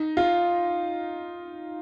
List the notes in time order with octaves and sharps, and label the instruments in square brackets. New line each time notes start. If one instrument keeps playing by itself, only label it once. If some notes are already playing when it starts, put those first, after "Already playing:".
Already playing: [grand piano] D#4
F4